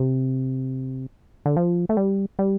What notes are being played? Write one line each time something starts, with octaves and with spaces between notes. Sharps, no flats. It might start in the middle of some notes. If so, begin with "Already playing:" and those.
Already playing: C3
D3
F3
A3
G3
G3